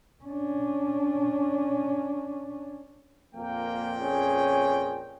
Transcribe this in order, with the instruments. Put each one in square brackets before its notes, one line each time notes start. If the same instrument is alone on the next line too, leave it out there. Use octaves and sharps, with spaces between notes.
[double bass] C#4 D4
[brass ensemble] F2 A#2 G5 [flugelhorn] A#3
[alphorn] C#4 [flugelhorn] G#4